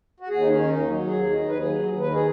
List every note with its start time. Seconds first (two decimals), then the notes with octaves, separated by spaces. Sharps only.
0.20 F#4
0.28 D#2 G#4
0.40 D#4
0.48 D#3 C#4
0.68 D#2 D#4
0.87 F#3
1.06 D#2 G#4
1.25 D#3
1.46 D#2 B4
1.58 G#4
1.64 F#3
1.85 D#2
1.99 B4
2.04 D#3
2.13 G#4